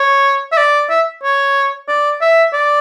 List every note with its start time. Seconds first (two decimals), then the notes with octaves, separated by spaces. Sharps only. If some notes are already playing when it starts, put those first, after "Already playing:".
Already playing: C#5
0.52 E5
0.57 D5
0.90 E5
1.23 C#5
1.88 D5
2.21 E5
2.53 D5